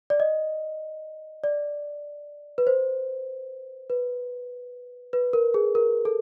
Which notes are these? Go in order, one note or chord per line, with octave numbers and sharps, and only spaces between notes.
D5
D#5
D5
B4
C5
B4
B4
A#4
G#4
A#4
A4